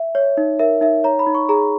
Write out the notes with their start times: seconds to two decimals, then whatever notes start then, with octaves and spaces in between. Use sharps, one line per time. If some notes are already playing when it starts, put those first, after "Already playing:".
Already playing: E5
0.15 C#5
0.37 D#4
0.59 A#4 E5
0.81 D#4 E5
1.04 C#5 A#5
1.19 B5
1.27 D#4
1.34 C#6
1.49 G#4 A#5